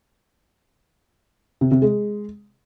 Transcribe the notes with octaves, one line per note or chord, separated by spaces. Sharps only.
C3
C3
G#3